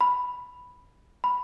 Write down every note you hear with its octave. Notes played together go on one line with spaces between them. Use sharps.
B5
B5